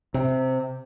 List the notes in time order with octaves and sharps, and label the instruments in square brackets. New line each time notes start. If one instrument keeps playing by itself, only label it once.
[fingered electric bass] C3